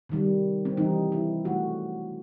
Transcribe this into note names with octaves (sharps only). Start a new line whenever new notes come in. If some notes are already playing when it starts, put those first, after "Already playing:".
C3 D#3 G3
C4
C3 E3 G3 D#4
E4
B2 F#3 A3 F#4